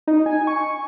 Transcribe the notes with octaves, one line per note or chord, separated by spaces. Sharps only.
D#4
G#5
C#6